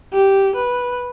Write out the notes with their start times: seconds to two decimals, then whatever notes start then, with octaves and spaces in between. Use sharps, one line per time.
0.14 G4
0.56 B4